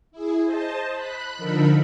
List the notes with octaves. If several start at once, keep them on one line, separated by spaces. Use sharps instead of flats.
E4 G#4
C5 D#5 A5
B5 F#6
D3 F3 D#4 A4 A#4 B5